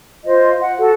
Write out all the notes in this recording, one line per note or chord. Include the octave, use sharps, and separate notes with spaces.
F4 C5 D#5
F#5
F#4 A4